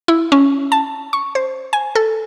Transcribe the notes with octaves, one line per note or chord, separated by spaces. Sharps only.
E4
C#4
A5
C#6
C5
G#5
A4